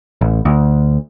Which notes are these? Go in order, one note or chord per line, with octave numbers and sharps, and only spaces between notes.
A1
D2